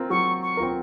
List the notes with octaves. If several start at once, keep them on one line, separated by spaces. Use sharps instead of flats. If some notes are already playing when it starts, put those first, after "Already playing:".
Already playing: C4 F4 A#4
F#3 C#6
C#6
C4 F4 A#4